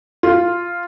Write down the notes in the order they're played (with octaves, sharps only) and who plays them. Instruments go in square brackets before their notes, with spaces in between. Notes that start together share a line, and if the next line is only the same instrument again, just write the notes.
[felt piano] F4